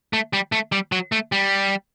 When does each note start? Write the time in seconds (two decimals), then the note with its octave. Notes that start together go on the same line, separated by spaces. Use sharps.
0.13 A3
0.33 G3
0.52 A3
0.72 G3
0.92 F#3
1.12 A3
1.32 G3